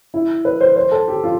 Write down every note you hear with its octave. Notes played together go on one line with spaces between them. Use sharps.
E4
B4
C5
C5
A4
G4
F4